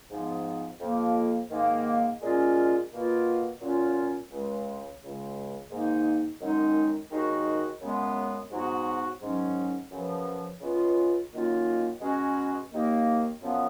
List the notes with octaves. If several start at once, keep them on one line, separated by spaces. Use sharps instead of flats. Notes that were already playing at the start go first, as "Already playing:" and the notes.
G#2 F3 B3
F2 F3 A#3
G#2 D#3 A#3
A#2 G#3 C#4 F4
B2 A#3 F4
A#2 F#3 C#4 F4
C#2 C#3 G#3
C#2 C#3 G#3
G#2 D#3 A#3 D#4
F#2 D#3 G#3 D#4
D#2 D#3 G#3 D#4 F#4
F#2 C#3 G#3 B3
G#2 F#3 B3 F#4
G#2 D#3 F#3 C#4
F#2 C#3 F3 B3
C#2 C#3 G#3 B3 F4
F#2 D#3 A#3 F4
B2 G#3 C#4 F#4
D#2 D#3 A#3
F#2 F3 B3